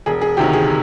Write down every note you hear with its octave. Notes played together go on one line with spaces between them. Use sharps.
E1 G#4
G#4
D2 C3 D#3 G4
G#4